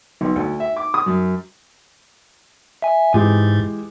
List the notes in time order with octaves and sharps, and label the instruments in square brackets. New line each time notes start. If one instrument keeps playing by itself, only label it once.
[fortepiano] B1
D2
E5
D6
D#6
F#2
[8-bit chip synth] E5 G#5
[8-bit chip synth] G#2 [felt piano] E3 G#3 G4